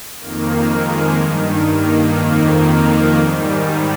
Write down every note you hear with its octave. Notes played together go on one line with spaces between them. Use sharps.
F2 D#3 A#3
G#3
G2 D#3
A#3
F2 D#3 A#3
A#3
G#2 D#3 G3